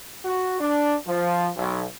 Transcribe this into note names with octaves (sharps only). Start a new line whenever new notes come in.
F#4
D4
F3
B1